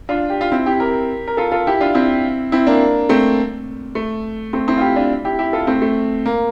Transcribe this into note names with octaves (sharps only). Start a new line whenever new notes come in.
D4 F4
G4
F4
C4 E4
E4 G4
G4 A#4
A#4
F4 A4
F4 A4
E4 G4
D4 F4
C4 E4
C4 E4
A#3 D4
A3 C4
A3
A3 C4
C4 E4
F4
E4 G4
D4 F4
E4 G4
E4 G4
F4 A4
A3 C4
A3
A#3